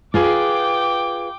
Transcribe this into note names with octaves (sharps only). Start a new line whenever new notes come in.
F4 G#4 B4 G5 D6